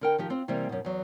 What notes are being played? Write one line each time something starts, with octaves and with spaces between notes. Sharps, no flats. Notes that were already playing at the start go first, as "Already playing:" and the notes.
D3 A#4 G5
D#3 F3 G4
C4 F4
C3 E3 G3 A#3 C4
F#2 B2
E2 F#3